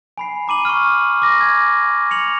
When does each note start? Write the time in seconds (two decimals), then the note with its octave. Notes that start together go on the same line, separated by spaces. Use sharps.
0.18 G#5 B5 C7
0.48 A#5 D6 D#7 F#7
0.65 C#6 F6
1.22 D6 A#6
1.41 G#5 G#6
2.11 C#7 F7 F#7